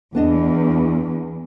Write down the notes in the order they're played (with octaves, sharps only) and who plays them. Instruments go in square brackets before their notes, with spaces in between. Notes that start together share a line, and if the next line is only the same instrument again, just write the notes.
[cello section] E2 [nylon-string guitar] B3 D4 D#5